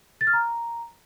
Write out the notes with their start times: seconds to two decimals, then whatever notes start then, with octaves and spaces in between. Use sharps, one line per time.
0.21 A6
0.27 F6
0.33 A#5